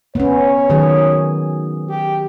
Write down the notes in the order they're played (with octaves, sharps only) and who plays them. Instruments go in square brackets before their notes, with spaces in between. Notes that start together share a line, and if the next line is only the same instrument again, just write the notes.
[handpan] B3 C#4 [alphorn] C#5
[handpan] D#3 F#3 G#4
[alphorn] G4